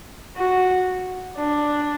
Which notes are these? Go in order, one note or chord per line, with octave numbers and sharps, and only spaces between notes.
F#4
D4